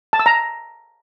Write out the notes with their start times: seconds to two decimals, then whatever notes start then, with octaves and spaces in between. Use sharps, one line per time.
0.13 A5
0.19 E6
0.26 A#5